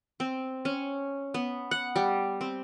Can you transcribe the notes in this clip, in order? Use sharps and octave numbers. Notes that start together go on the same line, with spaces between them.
C4
C#4
B3
F#5
G3
C4